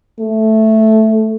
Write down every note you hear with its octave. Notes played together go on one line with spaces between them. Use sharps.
A3